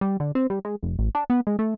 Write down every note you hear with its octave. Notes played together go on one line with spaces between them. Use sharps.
G3
D3
C4
G3
G#3
F1
A1
D4
B3
G#3
A3